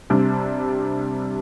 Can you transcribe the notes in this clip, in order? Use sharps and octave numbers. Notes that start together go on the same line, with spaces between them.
C3 G3 D4